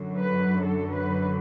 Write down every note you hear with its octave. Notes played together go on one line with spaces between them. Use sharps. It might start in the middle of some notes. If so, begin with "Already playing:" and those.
Already playing: F#2 D3 F#3
B4
A4
B4